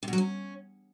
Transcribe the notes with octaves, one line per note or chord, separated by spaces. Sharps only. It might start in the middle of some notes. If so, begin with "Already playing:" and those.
C3
B2
F#3
C#4